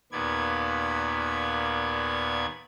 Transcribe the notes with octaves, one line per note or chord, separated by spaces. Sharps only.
D#2 A#2 B3 D5 G#6